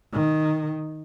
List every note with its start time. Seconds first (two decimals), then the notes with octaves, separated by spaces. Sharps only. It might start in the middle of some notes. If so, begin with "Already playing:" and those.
0.13 D#3